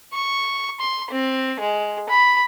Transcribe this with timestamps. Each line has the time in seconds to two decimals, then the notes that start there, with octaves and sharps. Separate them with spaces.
0.13 C#6
0.80 C6
1.11 C4
1.60 G#3
2.09 B5